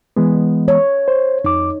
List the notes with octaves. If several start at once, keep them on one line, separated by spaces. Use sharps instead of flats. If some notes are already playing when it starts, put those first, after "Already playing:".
E3 G#3 B3
C#5
C5
F2 D#4 D6